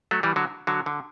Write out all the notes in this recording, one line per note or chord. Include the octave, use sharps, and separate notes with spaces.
F#3 A3
E3 G3
D3 F#3
D3 F#3
D3